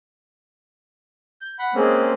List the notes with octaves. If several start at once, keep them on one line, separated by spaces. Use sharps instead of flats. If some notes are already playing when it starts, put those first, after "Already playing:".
G6
F#5 B5
G#3 A#3 C4 C#4